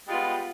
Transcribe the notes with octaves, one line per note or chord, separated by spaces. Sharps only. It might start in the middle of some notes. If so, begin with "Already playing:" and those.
G3 G#3 B3 F4